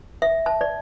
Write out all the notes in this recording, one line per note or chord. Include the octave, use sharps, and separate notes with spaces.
E5
A5
D5